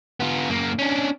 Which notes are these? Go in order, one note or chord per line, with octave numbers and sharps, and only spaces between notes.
B3 F4
F#2 A#3
C#4 D4